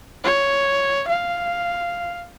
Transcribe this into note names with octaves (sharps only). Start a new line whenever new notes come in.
C#5
F5